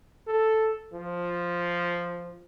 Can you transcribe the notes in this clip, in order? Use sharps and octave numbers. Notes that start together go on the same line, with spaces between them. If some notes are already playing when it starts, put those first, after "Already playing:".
A4
F3